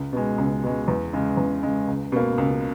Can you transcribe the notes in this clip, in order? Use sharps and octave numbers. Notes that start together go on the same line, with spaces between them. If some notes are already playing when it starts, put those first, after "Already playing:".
Already playing: C#2
B2 G#3
C#2
B2 G#3
E2
C#3 G#3
E2
C#3 G#3
C#2
B2 A#3
C#2